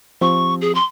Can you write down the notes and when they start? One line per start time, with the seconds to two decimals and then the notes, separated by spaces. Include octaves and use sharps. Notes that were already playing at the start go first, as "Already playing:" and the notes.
0.21 F3 C4 G4 C#6
0.61 G#4
0.75 C6